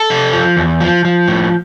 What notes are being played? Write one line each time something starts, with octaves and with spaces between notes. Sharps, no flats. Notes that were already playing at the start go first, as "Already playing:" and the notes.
Already playing: A4
C3
F3
E2
F3
F3
A2